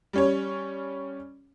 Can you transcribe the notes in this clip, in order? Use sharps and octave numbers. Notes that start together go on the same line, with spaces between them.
G3 C#4 C#5